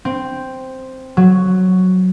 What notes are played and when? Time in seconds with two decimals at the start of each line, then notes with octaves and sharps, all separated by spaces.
0.05 C4
1.17 F#3